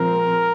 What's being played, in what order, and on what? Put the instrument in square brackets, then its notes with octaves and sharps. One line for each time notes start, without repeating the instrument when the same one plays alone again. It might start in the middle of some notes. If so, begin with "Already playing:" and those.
Already playing: [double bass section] A#2 F3 G#3 C4 [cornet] A#4